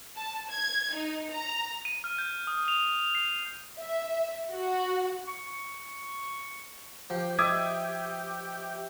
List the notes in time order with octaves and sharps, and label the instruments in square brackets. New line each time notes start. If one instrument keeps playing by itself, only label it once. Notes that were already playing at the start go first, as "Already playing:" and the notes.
[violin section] A5
G#6
D#4
A#5
[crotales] D#7
F6
G6
D#6
F7
C7
[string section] E5
F#4
[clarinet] C#6
[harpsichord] F3 [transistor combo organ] G4
[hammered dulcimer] E5 [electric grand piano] D6 D#6 G#6